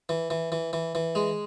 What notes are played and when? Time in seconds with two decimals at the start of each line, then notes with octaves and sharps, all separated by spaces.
0.09 E3
0.30 E3
0.52 E3
0.73 E3
0.95 E3
1.15 G#3